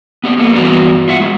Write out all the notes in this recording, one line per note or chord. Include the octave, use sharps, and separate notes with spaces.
B3 G4 D5
A#3 A4 B4
G2 E3 B3 F#4 D5 A#5
F4 E5 F#5
G#3 F#4